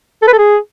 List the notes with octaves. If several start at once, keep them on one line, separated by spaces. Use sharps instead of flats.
A4
B4
A4
G#4